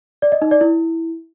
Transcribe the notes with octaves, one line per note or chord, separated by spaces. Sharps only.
D5
D#5
D#4
D5
E4